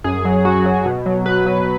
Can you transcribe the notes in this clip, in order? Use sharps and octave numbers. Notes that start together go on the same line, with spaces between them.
F#2 G#4
F#3
F#2 F#4
F#3
B2
F#3
B2 B4
F#3